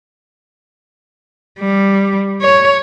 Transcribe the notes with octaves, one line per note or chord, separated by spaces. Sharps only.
G3
C#5